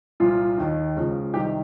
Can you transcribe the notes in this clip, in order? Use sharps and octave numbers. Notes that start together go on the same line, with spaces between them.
C2 A#2 F3 F4
D#2 D#3
C#2 C#3 F3
C2 C3 D#3 G4